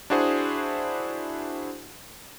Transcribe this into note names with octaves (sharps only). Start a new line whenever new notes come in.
D4 E4 F#4 G#4 C5